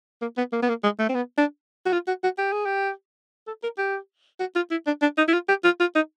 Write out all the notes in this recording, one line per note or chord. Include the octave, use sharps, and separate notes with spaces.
A#3
B3
A#3
B3
A#3
G#3
A3
C4
B3
D4
F#4
F4
F#4
F#4
G4
G#4
G4
A4
A#4
G4
F#4
F4
E4
D4
D4
D#4
E4
F4
G4
F4
F4
D#4